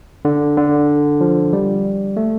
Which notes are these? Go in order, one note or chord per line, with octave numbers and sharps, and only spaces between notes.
D3
D3
F3
G3
A3